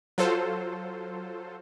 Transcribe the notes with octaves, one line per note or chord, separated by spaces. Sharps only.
F#3 F4 A4 C5